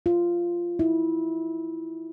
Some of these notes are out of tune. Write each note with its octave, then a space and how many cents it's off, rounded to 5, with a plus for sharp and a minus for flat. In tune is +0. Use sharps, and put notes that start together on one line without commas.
F4 -10
E4 -20